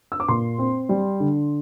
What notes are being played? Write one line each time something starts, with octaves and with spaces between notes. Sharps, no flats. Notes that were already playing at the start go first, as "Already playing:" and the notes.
E6
D6
A#2 C6
C4
G3
D3